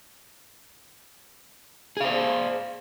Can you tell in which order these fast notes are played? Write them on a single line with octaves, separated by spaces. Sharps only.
G#4 F5 C5